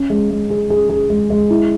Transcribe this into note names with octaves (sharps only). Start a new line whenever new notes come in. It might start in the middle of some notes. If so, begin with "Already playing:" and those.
Already playing: C#4
G#3
G#3
G#4
G#4
G#4
G#3
G#3
E4